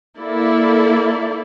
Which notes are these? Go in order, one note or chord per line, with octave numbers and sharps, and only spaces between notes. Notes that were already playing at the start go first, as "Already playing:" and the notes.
A#3 E4 A4 D5